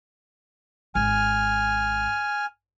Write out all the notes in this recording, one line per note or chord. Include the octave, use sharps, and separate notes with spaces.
G#1 G#5 F6